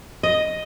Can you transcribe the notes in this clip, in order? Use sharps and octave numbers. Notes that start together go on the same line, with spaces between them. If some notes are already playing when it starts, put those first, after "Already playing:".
D#5